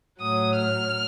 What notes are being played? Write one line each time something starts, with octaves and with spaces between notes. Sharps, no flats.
A2 F#3 D#6
F6